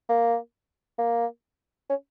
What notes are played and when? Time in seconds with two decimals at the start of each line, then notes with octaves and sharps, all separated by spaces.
0.09 A#3
0.99 A#3
1.90 C#4